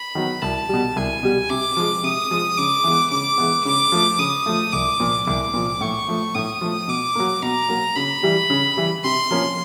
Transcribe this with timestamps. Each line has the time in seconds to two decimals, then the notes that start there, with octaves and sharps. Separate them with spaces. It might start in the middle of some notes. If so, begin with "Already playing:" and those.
Already playing: B5
0.15 D#3 F#3 B3
0.42 C2 A5
0.69 B2 G3
0.96 C2 G#5
1.23 B2 G3
1.50 C3 D6
1.77 F3 G#3
2.03 C3 D#6
2.31 F3 G#3
2.57 C#3 D6
2.84 E3 G#3 B3
3.11 C#3 D6
3.38 E3 G#3 B3
3.65 C#3 D6
3.92 F3 A3
4.19 C#3 D#6
4.46 F3 A3
4.73 C2 D6
5.00 A#2 F3
5.27 C2 D6
5.54 A#2 F3
5.81 A2 C#6
6.08 F3 A3
6.35 A2 D#6
6.61 F3 A3
6.88 B2 D6
7.15 F#3 A#3
7.43 B2 A#5
7.69 F#3 A#3
7.96 C#3 B5
8.23 E3 G3
8.50 C#3
8.77 E3 G3
9.04 C3 C6
9.31 F3 A#3 C#4